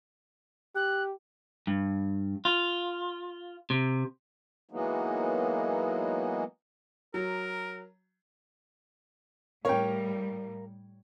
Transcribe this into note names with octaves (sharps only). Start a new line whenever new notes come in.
G4 F#6
G2
F4
C3
E3 F#3 G#3 A#3 B3 D#4
F#3 A#4
A2 G3 A#4 C#5 F5 G5